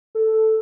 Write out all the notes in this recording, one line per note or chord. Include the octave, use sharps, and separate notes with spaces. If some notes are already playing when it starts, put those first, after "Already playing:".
A4